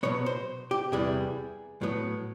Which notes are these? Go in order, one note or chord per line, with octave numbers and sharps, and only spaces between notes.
B2 F#3 B3 C#5
C5
G4
E2 C3 E3 G3 G#4
A2 F#3 B3